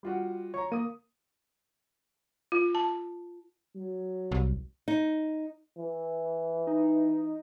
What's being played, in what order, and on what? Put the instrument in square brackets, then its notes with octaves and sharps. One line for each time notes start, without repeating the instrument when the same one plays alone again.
[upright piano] G3 F4 F#4
[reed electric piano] C#5 [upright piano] A#5 C#6
[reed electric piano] A#3 [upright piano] D#6 D#7
[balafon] F4
A5
[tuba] F#3
[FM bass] C2
[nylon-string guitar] D#4
[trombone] E3
[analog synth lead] D#4